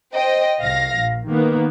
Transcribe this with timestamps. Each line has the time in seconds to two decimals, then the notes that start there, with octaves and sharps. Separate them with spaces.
0.14 C5 D#5 G5
0.60 C2 F5 A#6
0.96 A#1
1.29 D#3 A#3 B3